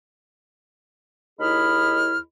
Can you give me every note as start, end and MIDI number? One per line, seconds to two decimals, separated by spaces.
1.40 2.17 39
1.40 2.17 63
1.40 2.17 64
1.40 2.17 68
1.40 2.17 83
1.40 2.17 89